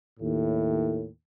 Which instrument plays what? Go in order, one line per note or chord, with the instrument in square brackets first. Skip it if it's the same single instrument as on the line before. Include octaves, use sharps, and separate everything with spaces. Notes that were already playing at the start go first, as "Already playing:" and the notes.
[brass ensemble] D#2 A2